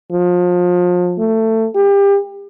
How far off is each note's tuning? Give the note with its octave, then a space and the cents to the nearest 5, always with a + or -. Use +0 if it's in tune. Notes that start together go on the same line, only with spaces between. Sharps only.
F3 +30
A3 +20
G4 +30